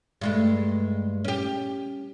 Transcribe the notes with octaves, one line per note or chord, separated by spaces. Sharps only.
G2 G#3 A3
C#4 G4